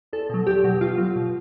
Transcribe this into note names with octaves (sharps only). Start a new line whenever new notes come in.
E2 A4
B2 F#3
E2 G4
B2 F#3
B2 F4
F#3
B2